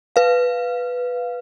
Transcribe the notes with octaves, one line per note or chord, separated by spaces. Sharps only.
B4 F5